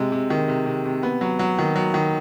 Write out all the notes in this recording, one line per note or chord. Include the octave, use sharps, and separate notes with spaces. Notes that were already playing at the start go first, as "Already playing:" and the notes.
Already playing: C3 G#3
C3
D#3
C3
C3
C3
B3
F#3
F#3
D#3
F#3
D#3